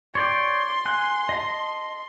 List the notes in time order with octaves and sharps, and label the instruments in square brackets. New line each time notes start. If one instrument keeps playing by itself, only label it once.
[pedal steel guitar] C#5 D5 G5 [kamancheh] C6
[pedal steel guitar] G#5 F#6
D#5 A5